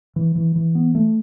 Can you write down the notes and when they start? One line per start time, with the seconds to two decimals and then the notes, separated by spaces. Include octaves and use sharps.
0.16 E3
0.35 E3
0.55 E3
0.75 B3
0.95 A3